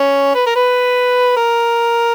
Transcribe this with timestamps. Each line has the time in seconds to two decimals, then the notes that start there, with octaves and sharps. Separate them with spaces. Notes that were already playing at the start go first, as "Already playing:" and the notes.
Already playing: C#4
0.35 B4
0.46 A#4
0.56 B4
1.36 A#4